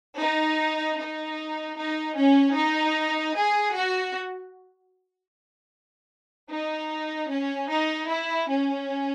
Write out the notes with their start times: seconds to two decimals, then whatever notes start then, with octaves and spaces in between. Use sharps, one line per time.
0.20 D#4
0.99 D#4
1.78 D#4
2.17 C#4
2.57 D#4
3.37 G#4
3.76 F#4
6.52 D#4
7.32 C#4
7.71 D#4
8.10 E4
8.50 C#4